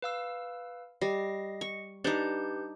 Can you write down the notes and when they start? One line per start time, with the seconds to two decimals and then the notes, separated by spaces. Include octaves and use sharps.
0.02 B4 F5 E6
1.01 G3 D#5 A#6 C7
1.61 C#6
2.04 D4 D#4 G4 B4 G6